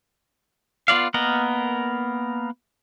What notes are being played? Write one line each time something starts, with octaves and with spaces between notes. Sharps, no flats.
B3 F4 D5 F5
A#3 B3 A#4 D#5